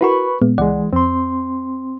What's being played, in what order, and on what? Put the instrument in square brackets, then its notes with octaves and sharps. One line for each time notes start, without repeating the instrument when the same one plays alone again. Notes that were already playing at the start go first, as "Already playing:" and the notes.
[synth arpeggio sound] E4 F#4 A#4 [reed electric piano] B4 B5 C#6
[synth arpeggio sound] A#2 G#3 B3
[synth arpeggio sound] C#2 D5 F#5 [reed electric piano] E3 G#3
[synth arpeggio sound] F2 [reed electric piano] C4 C6